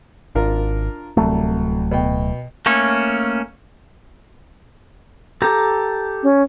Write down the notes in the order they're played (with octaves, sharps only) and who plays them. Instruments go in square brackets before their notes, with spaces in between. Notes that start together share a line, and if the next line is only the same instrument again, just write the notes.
[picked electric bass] G#1 [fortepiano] D4 F4 A#4
[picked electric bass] D1 F#3 A3 [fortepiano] C2
[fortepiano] B2 G5
[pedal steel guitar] A3 A#3 C#4 C#5
G4 A4 A#5
[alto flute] C#4